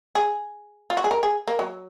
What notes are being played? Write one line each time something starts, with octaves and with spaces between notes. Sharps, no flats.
G#4
F4
F#4
G#4
A#4
G#4
A#3
F#3